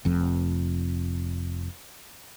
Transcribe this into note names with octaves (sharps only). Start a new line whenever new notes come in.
F1 F2